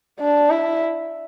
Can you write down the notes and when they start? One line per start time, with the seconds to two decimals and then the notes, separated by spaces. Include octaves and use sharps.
0.20 D4
0.51 E4